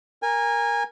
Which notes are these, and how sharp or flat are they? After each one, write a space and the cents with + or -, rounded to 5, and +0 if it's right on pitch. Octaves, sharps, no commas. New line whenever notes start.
A#4 +5 G#5 -20